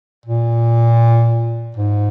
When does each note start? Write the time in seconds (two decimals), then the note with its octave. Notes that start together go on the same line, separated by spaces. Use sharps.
0.26 A#2
1.76 G#2